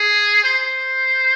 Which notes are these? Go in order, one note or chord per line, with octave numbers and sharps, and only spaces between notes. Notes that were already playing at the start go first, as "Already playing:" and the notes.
Already playing: G#4
C5